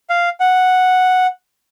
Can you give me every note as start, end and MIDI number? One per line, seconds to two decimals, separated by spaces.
0.10 0.29 77
0.40 1.27 78